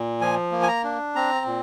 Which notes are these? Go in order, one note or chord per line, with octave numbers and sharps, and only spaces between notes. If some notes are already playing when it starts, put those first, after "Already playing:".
Already playing: A#2
F3 G#5
A#3
G#5
A#5
D4
C4 A#5
A#2